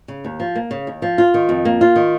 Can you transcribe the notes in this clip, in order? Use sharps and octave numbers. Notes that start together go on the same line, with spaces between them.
C#3
D#2
F3
A#3
C#3
D#2
F3
F4
D#3
F2
A#3
F4
D#3